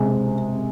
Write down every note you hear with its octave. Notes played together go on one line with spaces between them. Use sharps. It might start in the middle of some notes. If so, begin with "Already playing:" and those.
Already playing: C3 G#3